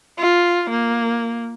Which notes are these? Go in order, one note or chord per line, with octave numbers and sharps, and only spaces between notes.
F4
A#3